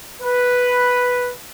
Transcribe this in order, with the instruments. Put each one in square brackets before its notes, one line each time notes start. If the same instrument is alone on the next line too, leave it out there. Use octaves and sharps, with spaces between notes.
[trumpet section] B4